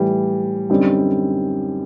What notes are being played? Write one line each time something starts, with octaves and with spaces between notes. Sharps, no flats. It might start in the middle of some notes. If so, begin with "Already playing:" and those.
Already playing: A2 E3 G3
F#2 D3 G3 C4 D#4